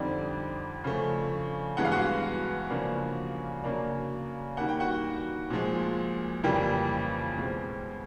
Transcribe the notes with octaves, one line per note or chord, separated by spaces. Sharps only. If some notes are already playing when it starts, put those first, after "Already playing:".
Already playing: F2 D3 G3 C4 D4 D#4 D5
C#3 F3 A3
G2 E3 G#3 B3 F#5
F5
F#4 F#5
C#3 F3 A#3 D4
C#3 F#3 A#3 D4
D#3 G3 A#3 F#5
G5
F#4 F#5
A#2 F3 G#3
F2 C#3 E3 G3 A#3 G4 G5
B2 G#3 C4